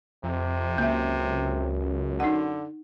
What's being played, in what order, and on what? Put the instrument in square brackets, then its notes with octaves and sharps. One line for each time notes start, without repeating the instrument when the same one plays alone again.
[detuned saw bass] F2 [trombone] C3
[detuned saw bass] C#2 [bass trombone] F#2 [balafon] A#3 E5
[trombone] D3 [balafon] D#4 F#5